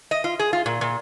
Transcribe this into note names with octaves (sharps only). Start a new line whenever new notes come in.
D#5
F4
G#4
F4
A#2
A#2